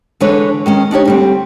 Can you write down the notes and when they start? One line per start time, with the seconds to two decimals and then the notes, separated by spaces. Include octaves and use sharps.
0.20 D3 E3 G#3 D4 B4 C#5
0.66 D#3 G#3 C#4
0.91 D4 D#4 G4 C#5
1.05 D2 G3 C4